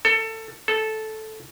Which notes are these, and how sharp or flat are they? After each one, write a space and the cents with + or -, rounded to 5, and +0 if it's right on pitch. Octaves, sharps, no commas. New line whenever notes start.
A4 +20
A4 -10